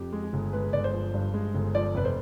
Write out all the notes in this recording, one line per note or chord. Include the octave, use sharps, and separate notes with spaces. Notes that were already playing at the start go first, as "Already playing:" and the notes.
Already playing: F2 G4
G#3
G#4
G1
G#3 B4
G1 D5
C5
F3
G2
G#3
G1
F3 D5
F1 B4
C5